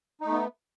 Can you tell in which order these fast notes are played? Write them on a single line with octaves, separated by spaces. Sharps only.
D#4 A3 B3